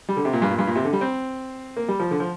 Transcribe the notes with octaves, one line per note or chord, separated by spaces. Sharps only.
G3
D3
C3
A#2
G2
A#2
G2
A#2
C3
D3
G3
C4
A#3
G3
F3
D3
F3